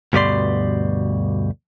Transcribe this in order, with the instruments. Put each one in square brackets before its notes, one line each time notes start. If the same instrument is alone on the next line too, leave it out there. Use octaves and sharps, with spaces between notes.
[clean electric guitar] D2 G2 B2 G4 D5 C6